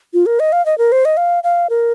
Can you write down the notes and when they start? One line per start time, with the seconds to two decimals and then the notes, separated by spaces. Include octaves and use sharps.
0.14 F4
0.26 A#4
0.40 D#5
0.52 F5
0.66 D#5
0.78 A#4
0.92 C5
1.05 D#5
1.17 F5
1.44 F5
1.70 A#4